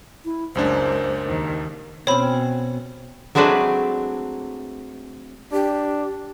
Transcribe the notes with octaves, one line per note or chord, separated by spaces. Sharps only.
E4
C#2 F#2 G#3 A#3 D4 C5
D#2 D#3
B2 C4 C#4 C#5 B5
F#3 G#3 A3 C4 D4 B4
D4 G4